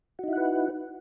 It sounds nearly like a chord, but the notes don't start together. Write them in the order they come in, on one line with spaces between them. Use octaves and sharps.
F#4 D#4 E4 F#5 B4